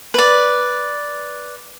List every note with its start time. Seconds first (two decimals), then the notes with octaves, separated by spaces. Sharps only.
0.14 B4 D5